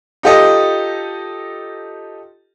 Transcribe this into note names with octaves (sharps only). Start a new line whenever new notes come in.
D#4 F4 G4 A4 D#5